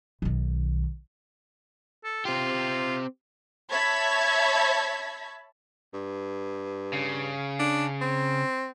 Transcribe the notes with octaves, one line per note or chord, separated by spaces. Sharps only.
B1 D#3
A4
C4 F4 G4
C#5 E5 A5 B5 G#6 B6
G2
C#3
D4
C4